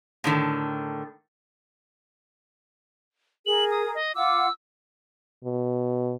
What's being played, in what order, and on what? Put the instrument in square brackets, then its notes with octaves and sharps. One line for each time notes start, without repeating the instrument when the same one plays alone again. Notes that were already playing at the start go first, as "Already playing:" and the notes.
[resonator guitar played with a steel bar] A2 D3 D#3
[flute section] G#4 A#4 [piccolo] F#7
[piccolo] D#6
D#5
[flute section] F4 F#5 D6 [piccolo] E6
[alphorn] B2